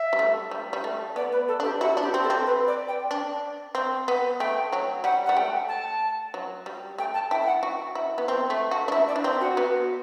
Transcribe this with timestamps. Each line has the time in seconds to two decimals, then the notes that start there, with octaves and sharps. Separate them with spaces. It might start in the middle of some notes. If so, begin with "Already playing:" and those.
Already playing: E5
0.13 G3
0.19 A3
0.51 G3
0.73 G3
0.84 A3
1.16 B3 D5
1.32 B4
1.48 A4
1.60 D4 G4
1.81 E4 F#4
1.97 D4
2.02 G4
2.14 C4
2.24 A4
2.30 C4
2.46 B4
2.68 D5
2.88 G5
3.11 D4
3.75 C4
4.08 B3
4.40 A3 G5
4.73 F#3
5.04 G3 F#5
5.26 G3 F#5
5.37 A3 G5
5.69 A5
6.34 F#3
6.66 G3
6.98 A3 G5
7.14 A5
7.31 E4 G5
7.42 G5
7.47 F#5
7.63 F#4
7.95 E4
8.18 B3
8.28 C4
8.50 A3
8.71 F#4
8.88 D4
8.92 E4 E5
9.08 D5
9.16 D4
9.24 C4
9.40 F#4
9.57 B3